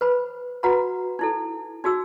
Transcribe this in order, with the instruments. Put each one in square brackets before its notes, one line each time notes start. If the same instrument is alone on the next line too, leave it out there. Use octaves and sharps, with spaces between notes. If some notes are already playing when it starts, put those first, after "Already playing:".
[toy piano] B4 C5 B5
F#4 B4 F#5 A#5 B5
D#4 E4 A4
D#4 F#4 G#4 E6